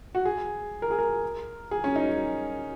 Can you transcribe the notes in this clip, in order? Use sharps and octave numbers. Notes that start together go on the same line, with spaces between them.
F#4
G#4
A#4
G#4
A#4
G#4
C#4
D#4